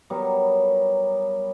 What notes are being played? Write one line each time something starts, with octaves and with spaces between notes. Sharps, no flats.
F#3 G3 B3 A#4